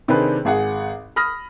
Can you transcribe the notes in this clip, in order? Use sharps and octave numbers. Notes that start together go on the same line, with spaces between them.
C3 D#3 C4 D4 G#4 B4
G#1 G#4 F#5
B5 D#6 F6 A#6